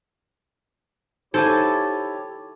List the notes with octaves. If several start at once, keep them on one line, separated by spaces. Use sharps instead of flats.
D#4 E4 G4 A4 C5 C#5 G#5